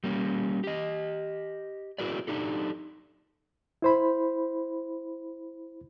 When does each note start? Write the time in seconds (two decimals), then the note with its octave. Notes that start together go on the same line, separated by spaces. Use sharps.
0.04 G3 A#3 C#4
0.64 G4 D#5
1.98 E4 F#4 G#4 A#4 B4 D5
2.27 D4 D#4 G4 A4
3.82 E4 C5 B5